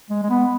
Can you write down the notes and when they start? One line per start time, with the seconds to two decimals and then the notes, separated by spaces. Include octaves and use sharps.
0.10 G#3
0.23 G#3
0.30 B3